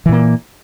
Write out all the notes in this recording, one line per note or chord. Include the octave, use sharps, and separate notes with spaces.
A#2 E3 A#3